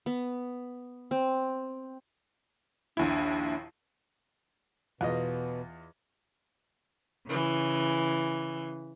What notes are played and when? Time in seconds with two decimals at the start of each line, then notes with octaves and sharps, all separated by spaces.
0.06 B3
1.11 C4
2.97 A#1 D#2 D4 E4
5.01 E2 B2 F4 D#5
7.27 C#3 E3